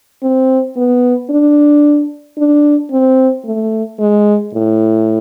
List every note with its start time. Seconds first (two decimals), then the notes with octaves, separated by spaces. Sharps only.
0.23 C4
0.77 B3
1.30 D4
2.38 D4
2.91 C4
3.45 A3
3.99 G#3
4.54 A2